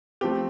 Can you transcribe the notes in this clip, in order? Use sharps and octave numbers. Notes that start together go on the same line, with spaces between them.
F3 A3 C4 G4